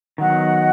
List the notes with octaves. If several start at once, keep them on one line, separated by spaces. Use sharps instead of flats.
D#3 F#3 B3 D#5 F#5